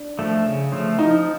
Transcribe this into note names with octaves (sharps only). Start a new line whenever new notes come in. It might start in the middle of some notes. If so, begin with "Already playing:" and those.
Already playing: D4
F3 A3
C#3
F3 A3
F3 D#4